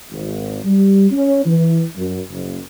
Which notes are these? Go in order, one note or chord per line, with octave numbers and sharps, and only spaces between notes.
G#1
G3
C#4
E3
F#2
F#1